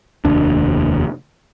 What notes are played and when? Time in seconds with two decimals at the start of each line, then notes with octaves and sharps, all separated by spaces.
0.25 F1 D#2 D4